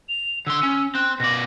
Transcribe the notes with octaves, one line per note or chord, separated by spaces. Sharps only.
F7
D3 C6 E6
C#4
C4 F#6
B2 D5 A#6